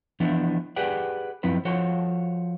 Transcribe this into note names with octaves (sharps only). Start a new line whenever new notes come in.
E3 F3 B3 D4 E4
G4 G#4 B4 D5 F#5
F#2 F3 C4 E4 B4
F3 F#4 A4 C5 C#5